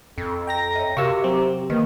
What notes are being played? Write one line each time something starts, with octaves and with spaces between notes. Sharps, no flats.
F2 A4
G5 A#5 A#6
C#5 D#5 E5
C3 F#4 G4 A#4 F5 C#6 E6
F#3 C4 A#5
D#3 A#3 B4 D#5